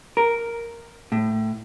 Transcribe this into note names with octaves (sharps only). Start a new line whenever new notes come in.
A#4
A2